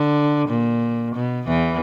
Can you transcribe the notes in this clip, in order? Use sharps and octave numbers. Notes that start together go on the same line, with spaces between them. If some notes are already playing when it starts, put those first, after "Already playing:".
Already playing: D3
A#2
B2
E2 E3